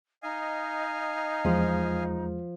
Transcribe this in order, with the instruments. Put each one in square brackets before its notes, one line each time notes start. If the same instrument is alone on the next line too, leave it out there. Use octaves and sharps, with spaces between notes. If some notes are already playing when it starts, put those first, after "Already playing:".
[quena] D#4 [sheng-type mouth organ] D#5 F5 G#5
[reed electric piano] E2 G#3 [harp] F3